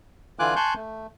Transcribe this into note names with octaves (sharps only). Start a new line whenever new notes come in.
D3 E3 F4 G#5 D6 F#6
G#5 A5 C6 C#6 F#6 G6
A3